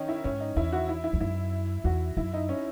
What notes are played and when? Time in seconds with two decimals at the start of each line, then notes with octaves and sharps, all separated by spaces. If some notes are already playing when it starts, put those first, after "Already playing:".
Already playing: D#3 C#4 D#4
0.08 E4
0.24 G#2 C#4
0.40 D#4
0.56 E2 E4
0.72 F#4
0.89 E4
1.04 E4
1.13 E2
1.20 F#2 E4
1.84 E2 F#4
2.17 F#2 E4
2.33 D#4
2.49 C#4